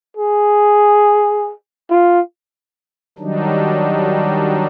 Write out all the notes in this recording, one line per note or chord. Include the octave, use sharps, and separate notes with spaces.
G#4
F4
D#3 F#3 G3 D4 D#4